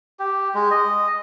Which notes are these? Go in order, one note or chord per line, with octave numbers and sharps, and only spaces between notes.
G4
G#3
D#5